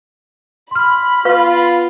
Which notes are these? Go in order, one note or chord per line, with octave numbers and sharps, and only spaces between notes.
B5 C6 F6
B3 F4 B4 F5 C#6